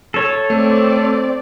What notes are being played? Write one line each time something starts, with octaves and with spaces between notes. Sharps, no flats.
A4 C#5
A3 C4 D5